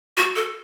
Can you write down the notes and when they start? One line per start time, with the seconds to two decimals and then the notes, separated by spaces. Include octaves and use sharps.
0.17 F#4
0.36 A4